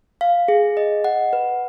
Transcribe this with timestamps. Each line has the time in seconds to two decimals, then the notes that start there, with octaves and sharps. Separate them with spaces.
0.21 F5
0.48 G#4
0.77 D#5
1.04 F#5
1.33 B4